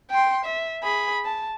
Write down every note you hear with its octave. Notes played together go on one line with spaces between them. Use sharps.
G5 C6
E5
G#4 B5
A5